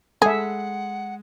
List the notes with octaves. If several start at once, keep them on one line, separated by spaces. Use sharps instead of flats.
G#3 G#4 A4 E5 F#5